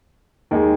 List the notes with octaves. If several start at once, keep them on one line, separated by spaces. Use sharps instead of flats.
D#2 D#3 G#3 D#4 G#4